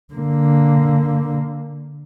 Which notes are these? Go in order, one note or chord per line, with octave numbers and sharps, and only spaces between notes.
D3 A#3